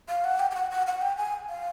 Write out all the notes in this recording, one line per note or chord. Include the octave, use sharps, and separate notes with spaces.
F5
F#5
G5
G5
F#5
F#5
F#5
G5
G#5
F5